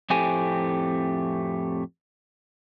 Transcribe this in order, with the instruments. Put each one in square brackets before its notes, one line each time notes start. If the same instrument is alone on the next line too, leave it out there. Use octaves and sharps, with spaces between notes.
[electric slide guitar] F2 A2 A3 C4 G4 G#5